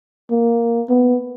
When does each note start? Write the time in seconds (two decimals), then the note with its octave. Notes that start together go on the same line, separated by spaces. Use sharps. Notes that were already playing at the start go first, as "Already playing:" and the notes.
0.31 A#3
0.89 B3